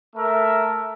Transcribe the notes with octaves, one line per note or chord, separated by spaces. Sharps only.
A3 A#4 E5